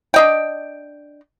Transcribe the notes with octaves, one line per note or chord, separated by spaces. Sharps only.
D4 D#5 G5